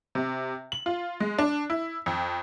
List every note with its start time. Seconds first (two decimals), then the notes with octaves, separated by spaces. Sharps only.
0.15 C3
0.72 F#7
0.86 F4
1.20 G#3
1.39 D4
1.70 E4
2.06 F2